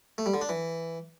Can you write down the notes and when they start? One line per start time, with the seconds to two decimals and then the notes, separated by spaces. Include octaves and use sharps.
0.18 A3
0.26 G3
0.34 D3
0.41 D4
0.49 E3